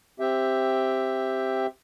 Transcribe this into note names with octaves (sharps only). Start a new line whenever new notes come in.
C4 G4 E5 G5